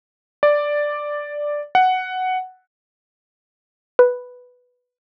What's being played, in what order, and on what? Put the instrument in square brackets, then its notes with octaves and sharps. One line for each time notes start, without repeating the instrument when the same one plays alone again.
[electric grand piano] D5
F#5
[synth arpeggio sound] B4